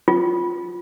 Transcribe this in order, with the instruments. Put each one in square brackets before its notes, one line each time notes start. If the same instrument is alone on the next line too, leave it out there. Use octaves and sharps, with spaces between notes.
[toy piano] F4